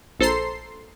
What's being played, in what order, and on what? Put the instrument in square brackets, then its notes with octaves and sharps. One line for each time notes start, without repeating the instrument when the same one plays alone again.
[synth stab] A#1 A4 C5 A#5 C6 C7